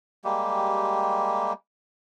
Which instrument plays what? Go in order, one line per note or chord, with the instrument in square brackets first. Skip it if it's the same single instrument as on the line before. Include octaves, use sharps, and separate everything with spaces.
[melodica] G3 G#3 A#3 G4